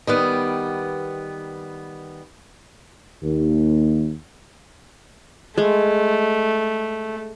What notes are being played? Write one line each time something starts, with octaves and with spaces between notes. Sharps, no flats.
D#3 G3 B3
D#2
G#3 A3